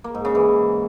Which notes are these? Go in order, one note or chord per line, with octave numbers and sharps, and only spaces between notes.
A#3
G#2
C#3
E3